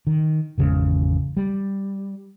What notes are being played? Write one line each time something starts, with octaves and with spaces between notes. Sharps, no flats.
D#3
G#1 E2 C#3 G#3
G3